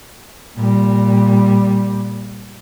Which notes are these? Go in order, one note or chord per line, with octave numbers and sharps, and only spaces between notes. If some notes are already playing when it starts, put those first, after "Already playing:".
A#2 G3